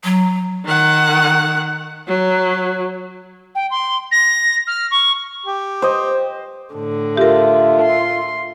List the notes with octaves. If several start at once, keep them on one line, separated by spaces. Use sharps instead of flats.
F#3
D#3 F#5
F#3
G5
C6
A#6
F6
C#6
G4
C5 D#5
A2 D3
F4 G4 A#4 E5
C6